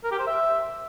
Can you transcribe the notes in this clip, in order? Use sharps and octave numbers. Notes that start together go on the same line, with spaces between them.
A#4
G4
C5
E5